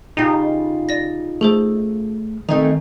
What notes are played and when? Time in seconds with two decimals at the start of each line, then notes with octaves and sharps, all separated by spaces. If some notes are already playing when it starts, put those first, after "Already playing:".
0.17 C#3 D#4 F4 G4
0.89 D5 A#6
1.41 A3 G#4 A4 C5
2.49 D#3 A3 A#3 C4 D#4 G#5 A#5